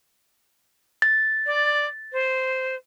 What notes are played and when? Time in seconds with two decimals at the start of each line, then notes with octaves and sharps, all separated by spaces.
1.02 A6
1.46 D5
2.12 C5